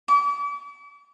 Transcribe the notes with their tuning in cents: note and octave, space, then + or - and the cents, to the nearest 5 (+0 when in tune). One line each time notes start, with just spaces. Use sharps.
D6 -40